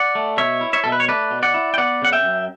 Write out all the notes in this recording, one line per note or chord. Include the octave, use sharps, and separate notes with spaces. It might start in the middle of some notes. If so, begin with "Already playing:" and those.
Already playing: D5 F#5
A3
B2 C#5 E5
E4
C#5 E5
B2 A4
B4
C#5
A3 B4 D5
B2
D5 F#5
E4
G5
B3 D5 F#5
C#3 F#5
E5 G5
F#2